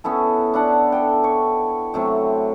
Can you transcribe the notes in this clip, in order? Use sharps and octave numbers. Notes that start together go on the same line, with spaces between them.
B3 C#4 E4 A4
D4 E4 F#5 A5
A4 G5
C#5
C3 F#3 A3 C4